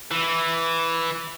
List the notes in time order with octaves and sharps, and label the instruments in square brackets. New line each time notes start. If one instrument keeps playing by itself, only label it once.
[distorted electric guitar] E3